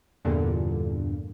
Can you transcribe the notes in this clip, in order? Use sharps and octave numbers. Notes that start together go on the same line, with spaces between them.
E2 G2 A#2 D3